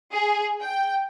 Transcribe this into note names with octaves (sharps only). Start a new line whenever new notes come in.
G#4
G5